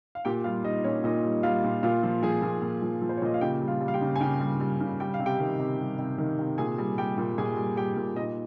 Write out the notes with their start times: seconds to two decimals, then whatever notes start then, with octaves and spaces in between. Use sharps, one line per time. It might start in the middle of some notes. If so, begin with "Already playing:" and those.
0.15 F5
0.25 A#2 G4 G5
0.44 G3 F4 F5
0.64 G3 D#4 D#5
0.84 A#2 C#4 C#5
1.04 A#2 D#4 D#5
1.25 G3
1.43 G3 F4 F5
1.64 A#2
1.83 A#2 F4 F5
2.03 F3
2.22 F3 G#4 G#5
2.42 A#2
2.62 A#2
2.82 F3
3.02 F3
3.09 C5
3.17 C#5
3.22 A#2 D#5
3.34 F5
3.41 C#3 G4 G5
3.61 G3
3.68 F4 F5
3.81 G3
3.88 F5
3.94 G4 G5
4.01 C#3
4.16 G#5
4.20 C#3 G4 G5
4.40 G3
4.60 G3
4.80 C#3
5.00 G3 G5
5.14 F5
5.20 C3
5.26 G4 G5
5.40 D#3
5.59 C3
5.79 G3
5.99 C3
6.18 D#3
6.39 C3
6.58 A#2 G#4 G#5
6.78 G3
6.98 G3 G4 G5
7.18 A#2
7.38 A#2 G#4 G#5
7.57 G3
7.77 G3 G4 G5
7.96 A#2
8.16 A#2 D#4 D#5